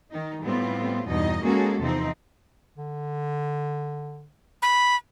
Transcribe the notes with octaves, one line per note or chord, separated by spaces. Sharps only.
D#3 D#4
A2 G3 B3 C4 F4
E2 G2 B2 D#4 D#5
G#3 A#3 C#4 F#4 G#4 A4
E2 C3 F3 C4 D#4
D3
B5